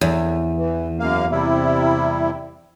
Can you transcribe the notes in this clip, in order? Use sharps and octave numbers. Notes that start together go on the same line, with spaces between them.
E2
E3
F#2 A#3 F5
C3 G3 E4